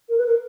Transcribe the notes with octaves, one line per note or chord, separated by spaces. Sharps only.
A#4
B4
A#4